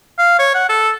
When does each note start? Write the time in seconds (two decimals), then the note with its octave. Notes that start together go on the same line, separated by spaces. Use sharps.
0.19 F5
0.39 C#5
0.55 F#5
0.69 A4